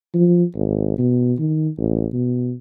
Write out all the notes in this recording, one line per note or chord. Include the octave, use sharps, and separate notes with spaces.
F3
G#1
B2
D#3
A1
B2